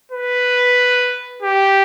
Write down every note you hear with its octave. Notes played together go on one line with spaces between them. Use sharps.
B4
G4